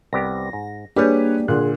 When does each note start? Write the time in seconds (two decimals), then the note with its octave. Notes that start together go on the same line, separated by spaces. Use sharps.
0.13 C2 B3 G4 A#6
0.53 G#2
0.96 G3 A#3 D4 G4 G#4 B4 C#5
1.48 A#2 D3 G#4 F#6